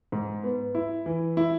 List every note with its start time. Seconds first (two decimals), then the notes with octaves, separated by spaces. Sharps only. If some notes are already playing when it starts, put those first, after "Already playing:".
0.12 G#2
0.44 B3
0.75 E4
1.06 E3
1.37 E4